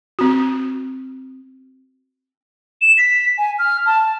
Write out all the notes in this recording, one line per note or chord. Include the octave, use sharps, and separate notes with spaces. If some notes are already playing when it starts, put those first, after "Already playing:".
C4 F#4
E7
B6
G#5
F6
A5